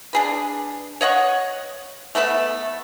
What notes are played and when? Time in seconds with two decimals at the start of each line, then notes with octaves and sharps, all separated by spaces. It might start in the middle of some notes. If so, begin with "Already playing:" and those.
0.13 D4 G#4 B4
1.01 C#5 D#5 F#5 C#6
2.15 A3 B3 A4 E5